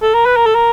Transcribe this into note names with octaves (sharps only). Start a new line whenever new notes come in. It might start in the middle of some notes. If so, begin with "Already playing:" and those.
A4
A#4
B4
A#4
A4
A#4